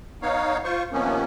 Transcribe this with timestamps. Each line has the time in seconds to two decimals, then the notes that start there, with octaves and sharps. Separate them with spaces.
0.22 B3 D#4 C#5 F5
0.64 F4 C5 C#6
0.93 C3 D#3 F3 A#3 B3 C#4